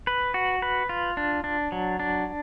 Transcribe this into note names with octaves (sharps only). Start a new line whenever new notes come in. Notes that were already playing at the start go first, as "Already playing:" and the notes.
B4
F#4
B4
F4
D4
D4
F#3
D4